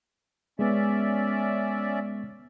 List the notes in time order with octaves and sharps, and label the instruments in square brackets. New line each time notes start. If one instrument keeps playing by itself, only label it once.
[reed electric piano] G#3 B3 [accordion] C#4 D5 E5